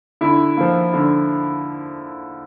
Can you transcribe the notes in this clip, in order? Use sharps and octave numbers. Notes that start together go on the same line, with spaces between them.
D3 E4
F3 A#3
D3